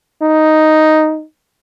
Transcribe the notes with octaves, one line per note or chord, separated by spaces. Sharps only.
D#4